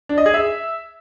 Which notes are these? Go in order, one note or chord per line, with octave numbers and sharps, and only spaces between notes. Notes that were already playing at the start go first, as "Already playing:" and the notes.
D4
D#5
G#4
E5